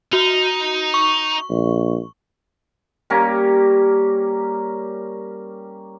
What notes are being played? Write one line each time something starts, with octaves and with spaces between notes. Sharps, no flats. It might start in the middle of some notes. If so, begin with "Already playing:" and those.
D#4 F#4
C#6
A#1
G3 A#3 C#4 A#4